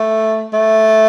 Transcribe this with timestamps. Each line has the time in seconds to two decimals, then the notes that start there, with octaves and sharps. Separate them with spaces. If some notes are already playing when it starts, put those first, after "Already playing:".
Already playing: A3
0.53 A3